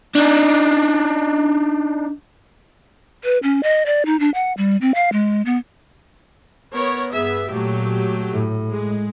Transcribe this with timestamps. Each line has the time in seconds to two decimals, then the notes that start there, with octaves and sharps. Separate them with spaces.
0.15 D4 D#4
3.24 B4
3.43 C#4
3.63 D#5
3.86 D5
4.06 D#4
4.20 D4
4.34 F#5
4.57 G3
4.81 C4
4.95 F5
5.12 G#3
5.46 B3
6.73 B3 A#4 C#5
7.11 G2 B3 G#4 E5
7.49 A#2 F#3 A3 G4
8.31 A2
8.71 G#3